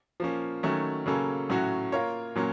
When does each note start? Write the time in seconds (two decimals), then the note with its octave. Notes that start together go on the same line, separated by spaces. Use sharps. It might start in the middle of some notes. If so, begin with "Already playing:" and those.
0.20 F3 A#3 C#4
0.63 D#3 F#3 A3 C#4
1.06 C#3 F#3 A#3 C#4 A4
1.50 A2 F#3 A3 C#4 F#4
1.92 A#3 F4 A#4 C#5
2.35 A#2 F#3 A#3 C#4